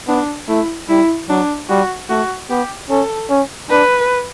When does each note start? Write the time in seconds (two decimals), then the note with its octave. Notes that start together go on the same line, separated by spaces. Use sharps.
0.08 B3 D4
0.48 A3 E4
0.89 G3 E4
1.29 F#3 D4
1.69 G3 F#4
2.09 A3 F#4
2.50 B3 G4
2.90 C#4 A4
3.30 C#4
3.70 D4 B4